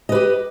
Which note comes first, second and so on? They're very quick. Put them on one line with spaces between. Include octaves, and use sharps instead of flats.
D#5 B4 G4